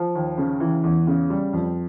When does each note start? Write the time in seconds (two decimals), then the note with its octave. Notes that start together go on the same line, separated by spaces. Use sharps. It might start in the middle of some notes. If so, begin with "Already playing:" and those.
Already playing: F3
0.15 D#2
0.38 C#3
0.60 E3
0.84 E2
1.07 C#3
1.30 G3
1.53 F2